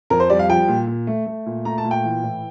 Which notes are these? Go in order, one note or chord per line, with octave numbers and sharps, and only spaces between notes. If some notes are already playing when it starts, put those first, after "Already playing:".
F2 A#4
C5
G3 D5
F5
F3 G5
A#2
A#2
A3
A3
A#2
A3 A#5
A5
A#2
G5
E3
A2